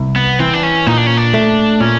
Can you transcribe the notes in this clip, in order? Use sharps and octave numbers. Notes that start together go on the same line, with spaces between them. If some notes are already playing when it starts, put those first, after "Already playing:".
Already playing: C2
B3
E3 C4
D4
C#4
A#2 D#4
D4
C#4
D4
A3
A#2 C#4